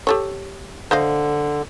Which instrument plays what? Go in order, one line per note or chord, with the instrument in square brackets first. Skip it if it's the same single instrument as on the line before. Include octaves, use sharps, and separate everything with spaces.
[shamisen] G4 A4 C#5
[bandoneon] D3 [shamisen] C5 D#5 F5